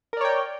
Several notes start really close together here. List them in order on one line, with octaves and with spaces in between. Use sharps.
A#4 D5 C#5 G5